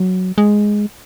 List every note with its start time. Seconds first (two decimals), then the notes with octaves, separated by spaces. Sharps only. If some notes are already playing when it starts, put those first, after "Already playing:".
Already playing: F#3
0.38 G#3